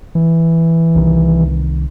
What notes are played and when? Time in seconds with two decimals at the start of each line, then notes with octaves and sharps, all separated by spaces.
0.15 E3
0.95 C2 D#3